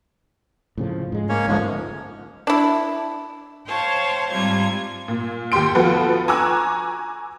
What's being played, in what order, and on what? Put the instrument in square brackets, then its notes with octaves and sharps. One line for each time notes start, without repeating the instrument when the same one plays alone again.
[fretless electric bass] A2 C#3 F3
G#2 G#3
[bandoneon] A#3 C#4 C#5
[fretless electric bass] G1 C#2 A3 [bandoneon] G#2 F3 G#3
[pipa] D4 E4
[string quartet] C5 C#5 F5 G5 A5
G#2 C3 G3 F4 G#6
[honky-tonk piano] A#2
D#2 G4 G5 C6 D7
F3 B3 F4 F#4 A4 B4
G#5 A#5 C#6 D6 E6 F#6